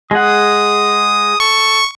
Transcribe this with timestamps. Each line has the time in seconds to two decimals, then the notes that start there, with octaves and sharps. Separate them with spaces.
0.11 G#3 G#4 F#5 D#6
1.40 A4 C#6